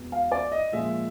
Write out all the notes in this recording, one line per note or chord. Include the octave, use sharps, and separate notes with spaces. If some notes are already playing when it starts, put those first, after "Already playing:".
Already playing: E2 B2 G#3 B3
F5
D5
D#5
A#2 F3 G#3 E5